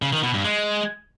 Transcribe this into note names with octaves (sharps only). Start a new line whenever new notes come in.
C#3
D#3
B2
G2
G#3